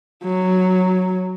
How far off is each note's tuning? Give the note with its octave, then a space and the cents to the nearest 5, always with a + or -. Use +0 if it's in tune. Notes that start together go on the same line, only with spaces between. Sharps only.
F#3 +0